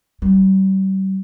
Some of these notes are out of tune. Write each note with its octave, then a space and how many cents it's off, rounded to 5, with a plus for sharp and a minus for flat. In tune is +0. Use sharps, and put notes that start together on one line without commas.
G3 -40